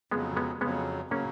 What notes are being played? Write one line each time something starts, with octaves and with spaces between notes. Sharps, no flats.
F2 C#3 F#3 G#3 B3
G#3 B3
F2 C#3 F#3 G#3 B3
C#3 F#3 A#3 C#4